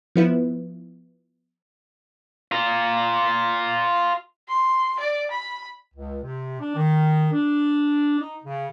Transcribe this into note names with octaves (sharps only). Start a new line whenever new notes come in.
F3 B3 E4
F4 A#4
C6
D5
B5
C#2
C3
D4
D#3
D4
D#4
C#3